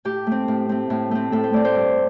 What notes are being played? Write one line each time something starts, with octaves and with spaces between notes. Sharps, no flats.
A2 G4
A3 C4
A2
A3 C4
A2
A3 C4
A2 A4
C5
A3 C4 D5
C5
G2